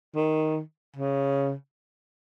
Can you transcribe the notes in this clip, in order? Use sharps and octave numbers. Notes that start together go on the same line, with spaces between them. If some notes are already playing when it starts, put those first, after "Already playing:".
D#3
C#3